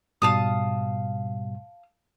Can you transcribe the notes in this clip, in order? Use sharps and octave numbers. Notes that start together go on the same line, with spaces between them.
G#2 B2 G3 F5 A5 D#6